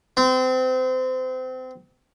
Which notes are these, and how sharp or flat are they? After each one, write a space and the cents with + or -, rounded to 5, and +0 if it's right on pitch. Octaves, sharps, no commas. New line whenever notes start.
C4 -30